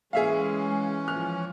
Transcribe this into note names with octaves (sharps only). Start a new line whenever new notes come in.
E3 G#3 C#4 G#4 E5 F5
F3 F6